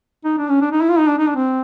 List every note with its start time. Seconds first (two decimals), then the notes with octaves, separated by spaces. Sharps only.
0.25 D#4
0.38 D4
0.49 C#4
0.61 D4
0.72 D#4
0.81 E4
0.89 F4
0.99 D#4
1.08 D4
1.18 D#4
1.28 D4
1.36 C4